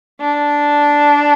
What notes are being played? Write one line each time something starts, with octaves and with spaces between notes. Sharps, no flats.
D4